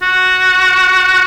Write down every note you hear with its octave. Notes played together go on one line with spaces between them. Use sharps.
F#4